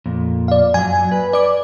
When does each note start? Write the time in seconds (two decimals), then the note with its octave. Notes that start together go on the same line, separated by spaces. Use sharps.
0.06 F2 A#2
0.48 D5 F5
0.74 F#2 F#3 G#5
1.12 B4
1.33 D5 D6